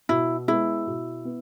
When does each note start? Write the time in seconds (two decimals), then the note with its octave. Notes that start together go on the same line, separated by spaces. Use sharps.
0.09 B2 E4
0.48 G#3 B3 E4
0.87 B2
1.25 B3